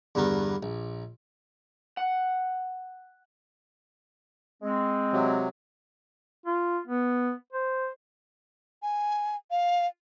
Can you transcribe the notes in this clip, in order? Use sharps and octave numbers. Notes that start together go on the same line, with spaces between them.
E2 G2 D3 B3 A#4 B4
A#1
F#5
G#3 C4
C3 F#3
F4
B3
C5
G#5
F5